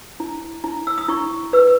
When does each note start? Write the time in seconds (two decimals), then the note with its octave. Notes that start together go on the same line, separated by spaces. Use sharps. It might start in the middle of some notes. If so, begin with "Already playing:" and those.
0.20 E4
0.64 E4
0.87 E6
0.98 D#6
1.08 E4 C#6
1.53 B4 E6